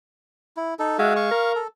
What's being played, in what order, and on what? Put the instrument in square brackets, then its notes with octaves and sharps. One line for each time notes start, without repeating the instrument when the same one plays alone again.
[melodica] E4
D#4 A4
[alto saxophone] G#3 [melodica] F#4 E5 F5
[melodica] F5 C#6
[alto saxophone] A#4
[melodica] A4